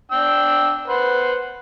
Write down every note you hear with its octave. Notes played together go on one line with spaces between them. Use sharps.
D4 G5 E6
B4 C5 F#5